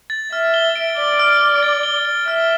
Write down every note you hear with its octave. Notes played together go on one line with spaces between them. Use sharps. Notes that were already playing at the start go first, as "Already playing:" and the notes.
A6
E5 F6
G7
D7
D5 G7
F6
F6
A6
G7
G7
E5 F6